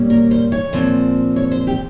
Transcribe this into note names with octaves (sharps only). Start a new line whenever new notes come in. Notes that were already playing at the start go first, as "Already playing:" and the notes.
Already playing: A#2 G3 A#3 C#4
A#4
C5
C#5
A#2 F3 C4
C#5
C5
G4